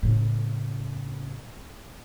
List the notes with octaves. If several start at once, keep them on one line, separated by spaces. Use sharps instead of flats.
A2 C#3